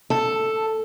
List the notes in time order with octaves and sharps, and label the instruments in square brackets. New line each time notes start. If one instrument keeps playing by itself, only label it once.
[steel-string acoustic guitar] A4